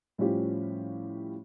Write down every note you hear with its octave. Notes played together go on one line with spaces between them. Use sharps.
A2 F3 G3 C#4 F4 G4